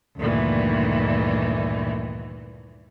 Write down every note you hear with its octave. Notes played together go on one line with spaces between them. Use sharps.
D2 G2 A#2 D#3 E3